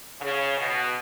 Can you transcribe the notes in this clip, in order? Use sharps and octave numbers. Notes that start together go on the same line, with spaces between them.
C#3
B2